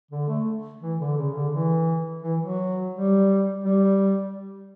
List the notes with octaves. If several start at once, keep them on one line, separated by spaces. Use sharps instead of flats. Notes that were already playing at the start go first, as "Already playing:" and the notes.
D3
A3
E3
D3
C#3
D3
E3
E3
F#3
G3
G3